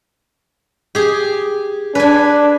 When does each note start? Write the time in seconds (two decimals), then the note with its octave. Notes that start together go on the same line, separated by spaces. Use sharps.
0.95 G4 G#4
1.95 D4 B4 G#5